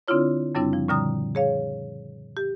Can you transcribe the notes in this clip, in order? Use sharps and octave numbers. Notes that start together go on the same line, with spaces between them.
D3 C4 D4 E4 F4 C#5
F#2 C#3 G3 C4 D4 E4
F3
A#2 D3 G3 A#5 D#6
G#4 C#5 F5
G4